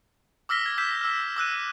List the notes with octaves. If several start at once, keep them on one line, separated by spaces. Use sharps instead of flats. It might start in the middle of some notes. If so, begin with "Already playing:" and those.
D6 E6 F6 A#6 B6 G7
G#6
E6 G6 B6 E7
E6 F6
D6 E6 F#6 D#7